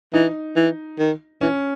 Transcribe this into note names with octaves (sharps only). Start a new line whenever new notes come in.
E3 D#4
E3
D#3
E3 C#4